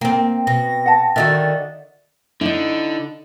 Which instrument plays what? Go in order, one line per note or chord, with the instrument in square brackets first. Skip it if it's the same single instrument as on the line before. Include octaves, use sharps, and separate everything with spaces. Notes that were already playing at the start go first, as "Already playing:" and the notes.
[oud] A#3 C4 [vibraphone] G5
[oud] B2 [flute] A#6
[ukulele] F#5 A5
[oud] D3 D#3 F#4 [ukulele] D#5 E5 [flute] A6
[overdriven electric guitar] D3 [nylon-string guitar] D#4 E4